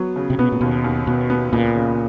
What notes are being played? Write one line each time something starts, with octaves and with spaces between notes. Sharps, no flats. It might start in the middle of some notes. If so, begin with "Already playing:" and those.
Already playing: F#3 B3
C#3
C3
B2 B3
A#2
D#2 B2
D#2
B2 B3
B3
C#2 A#2
C#3